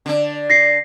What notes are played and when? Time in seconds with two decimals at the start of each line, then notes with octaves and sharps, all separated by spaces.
0.06 D3 D4
0.50 A#6 C7